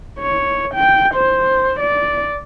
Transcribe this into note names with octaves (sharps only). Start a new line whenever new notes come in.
C#5
G5
C5
D5